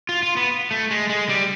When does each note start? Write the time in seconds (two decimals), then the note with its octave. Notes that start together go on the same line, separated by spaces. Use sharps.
0.09 F4
0.23 F4
0.37 B3
0.71 A3
0.91 G#3
1.10 G#3
1.29 G3